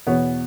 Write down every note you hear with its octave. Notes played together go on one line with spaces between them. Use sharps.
E2 B2 B3 F#4 C#5